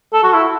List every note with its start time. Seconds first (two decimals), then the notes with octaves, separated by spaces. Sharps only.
0.14 A4
0.24 F#4
0.34 E4